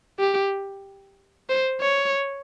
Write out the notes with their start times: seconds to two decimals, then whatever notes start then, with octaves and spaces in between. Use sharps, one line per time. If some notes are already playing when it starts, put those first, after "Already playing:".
0.20 G4
1.49 C5
1.81 C#5